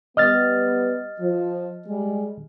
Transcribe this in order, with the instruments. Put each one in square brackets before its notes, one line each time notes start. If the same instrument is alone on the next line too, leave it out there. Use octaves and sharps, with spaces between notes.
[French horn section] G3 B3 [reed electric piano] D#5 F6 A6
[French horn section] F3
G3 G#3